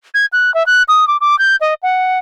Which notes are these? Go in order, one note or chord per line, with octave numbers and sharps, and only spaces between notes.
G#6
F#6
E5
F#6
D#6
D6
D6
G6
D#5
F#5